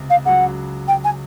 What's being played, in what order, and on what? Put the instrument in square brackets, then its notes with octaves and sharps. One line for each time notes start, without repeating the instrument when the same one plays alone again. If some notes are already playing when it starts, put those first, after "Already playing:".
Already playing: [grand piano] C#2 C3
[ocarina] F5
[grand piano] C#2 C#3 F#3 [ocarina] F#5
[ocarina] G5
G#5